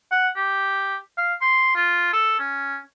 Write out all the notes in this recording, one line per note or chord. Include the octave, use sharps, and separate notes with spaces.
F#5
G4
F5
C6
F4
A4
C#4